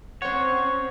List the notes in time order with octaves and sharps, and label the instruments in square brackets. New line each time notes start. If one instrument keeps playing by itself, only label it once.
[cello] C4 C#4 [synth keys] C5 F#5 [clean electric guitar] C#5